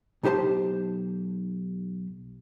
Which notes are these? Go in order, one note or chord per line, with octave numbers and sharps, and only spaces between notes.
B1 D#4 G4 C5 A5